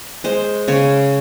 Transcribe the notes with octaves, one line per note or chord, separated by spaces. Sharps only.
G#3 C5
C#3 C#5